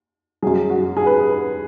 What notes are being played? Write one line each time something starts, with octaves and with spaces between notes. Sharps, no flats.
F#2 F#3 G#4
F#4
G#4
B4